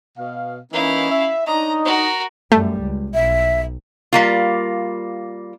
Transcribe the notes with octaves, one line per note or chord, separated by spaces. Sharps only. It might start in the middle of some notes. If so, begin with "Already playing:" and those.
B2 F5
E3 A#3 C#4 D#4 E4 F5
E5
D4 D#4 C#5 D#5 A#5
F#4 A#4
F#2 G3 A3
C#2
B1 E5
G3 A#3 F4